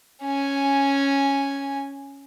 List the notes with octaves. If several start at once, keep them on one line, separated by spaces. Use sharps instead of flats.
C#4 G#5